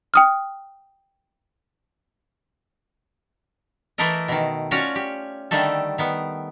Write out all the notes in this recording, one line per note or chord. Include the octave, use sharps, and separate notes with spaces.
G5 D#6 F6
E3 A3 E4 A4 A#4 D#5
B2 D#3
C#4 F4 F#4 C#5 D5
G4
D3 D#3 G3 A3 A4
D#3 B3